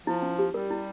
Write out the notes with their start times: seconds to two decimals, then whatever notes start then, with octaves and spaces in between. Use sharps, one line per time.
0.07 F3 E4
0.22 C#4
0.39 G4
0.54 G3 A#4
0.71 E4